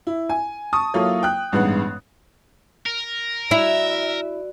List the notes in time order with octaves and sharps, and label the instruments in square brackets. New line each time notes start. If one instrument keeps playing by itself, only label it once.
[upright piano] E4
G#5
A5 C#6 D#6
F#3 A#3 E4 F4 A4 C#5
G5 F#6
A1 G2 G#3 B3 D#4 F#5
[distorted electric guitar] A#4
[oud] E4 [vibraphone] F#4 D5 [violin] E5